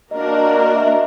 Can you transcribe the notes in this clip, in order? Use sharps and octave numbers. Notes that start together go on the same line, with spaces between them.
A#3 D4 F#4 A#4 D#5
D5
D#5
D5
D#5
E5
D#5